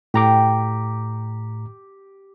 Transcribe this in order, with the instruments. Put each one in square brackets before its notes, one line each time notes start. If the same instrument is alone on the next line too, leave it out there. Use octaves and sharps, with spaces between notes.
[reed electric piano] A2 A#5 D6 [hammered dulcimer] G4